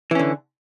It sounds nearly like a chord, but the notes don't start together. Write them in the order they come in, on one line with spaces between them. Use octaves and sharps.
E3 C#4 D3